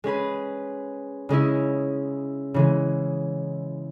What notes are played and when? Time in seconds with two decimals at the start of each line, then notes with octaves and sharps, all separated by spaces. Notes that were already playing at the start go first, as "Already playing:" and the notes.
0.04 G#3 C#4 G#4 B4
1.29 C#3 G#3 C#4 E4
2.54 C#3 E3 G#3